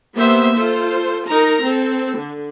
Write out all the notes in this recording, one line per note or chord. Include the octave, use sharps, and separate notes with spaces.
A#3 B3 G4 C5 E5
F4 A4 C5
D#4 A#4 A#5
C4 A4
D3